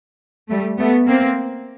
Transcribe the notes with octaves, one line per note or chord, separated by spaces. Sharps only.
G3 A3
A3 B3
A#3 C4